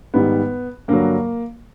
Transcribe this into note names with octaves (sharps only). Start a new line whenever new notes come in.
G#2 D#3 G3 B3
G2 D3 F#3 A#3